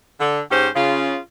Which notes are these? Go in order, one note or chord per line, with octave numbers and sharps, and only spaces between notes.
D3
G#2 C#4 G4 C5
C#3 F4